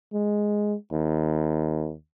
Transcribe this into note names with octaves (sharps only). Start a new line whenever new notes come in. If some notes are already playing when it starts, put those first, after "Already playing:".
G#3
D#2